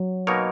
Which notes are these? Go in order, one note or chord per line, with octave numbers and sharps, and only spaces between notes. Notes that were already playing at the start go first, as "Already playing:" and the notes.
Already playing: F#3
B2 A#3 D#4 A#4 C#5